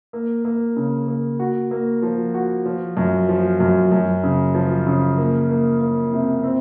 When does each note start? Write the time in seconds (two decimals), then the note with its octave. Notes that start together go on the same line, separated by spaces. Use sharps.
0.13 A#3
0.45 A#3
0.76 C#3
1.08 A#3
1.40 F#4
1.71 A#3
2.02 F3
2.34 F#4
2.66 F3
2.97 F#2
3.29 F3
3.60 F#2
3.92 F#2
4.24 C#3
4.55 F3
4.87 C#3
5.17 A#3
5.50 A#3
5.81 A#3
6.12 C3
6.43 C4